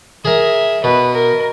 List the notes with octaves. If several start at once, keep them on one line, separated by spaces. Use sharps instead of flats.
G#4 A#4 E5
B2 B4
A#4